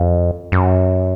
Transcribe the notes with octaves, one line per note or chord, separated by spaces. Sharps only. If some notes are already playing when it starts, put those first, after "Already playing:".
Already playing: F2
F#2